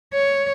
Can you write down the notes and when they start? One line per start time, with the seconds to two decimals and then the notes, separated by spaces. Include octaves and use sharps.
0.13 C#5